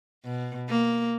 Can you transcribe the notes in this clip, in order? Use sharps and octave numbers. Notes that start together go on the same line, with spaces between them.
B2
A#3